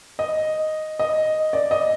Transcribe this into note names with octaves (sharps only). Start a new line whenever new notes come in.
D#5
D#5
D5
D#5